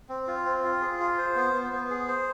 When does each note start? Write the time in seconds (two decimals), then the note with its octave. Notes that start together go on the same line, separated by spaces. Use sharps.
0.09 C4
0.27 F4
0.45 C4
0.64 F4
0.81 G#4
1.00 F4
1.18 C5
1.36 B3
1.53 B3
1.72 B3
1.90 G#4
2.08 C5